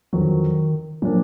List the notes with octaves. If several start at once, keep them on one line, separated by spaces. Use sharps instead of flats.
F2 D3 D#3 F#3
A#2 F3 F#3 A#3 D4